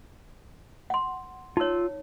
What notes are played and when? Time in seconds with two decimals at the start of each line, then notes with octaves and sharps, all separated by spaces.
0.90 F#5 C6
1.57 D#4 F4 C#5 E6